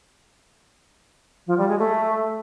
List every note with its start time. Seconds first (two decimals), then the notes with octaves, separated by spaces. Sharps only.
1.47 F3
1.57 G3
1.68 G#3
1.79 A3